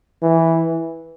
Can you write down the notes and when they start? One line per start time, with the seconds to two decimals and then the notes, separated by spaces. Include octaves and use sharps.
0.22 E3